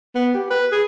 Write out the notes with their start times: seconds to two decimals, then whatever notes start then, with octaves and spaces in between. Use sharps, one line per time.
0.16 B3
0.35 G4
0.51 B4
0.72 G#4